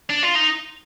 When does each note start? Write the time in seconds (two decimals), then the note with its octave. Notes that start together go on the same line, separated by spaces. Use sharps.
0.10 D4
0.23 F4
0.35 D#4